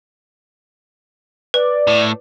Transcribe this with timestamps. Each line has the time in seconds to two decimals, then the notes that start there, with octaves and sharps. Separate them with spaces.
1.54 B4 D5
1.87 A2